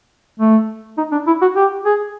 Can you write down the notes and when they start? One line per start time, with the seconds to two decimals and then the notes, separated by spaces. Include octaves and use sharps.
0.39 A3
0.98 D#4
1.12 D4
1.27 E4
1.41 F#4
1.56 G4
1.85 G#4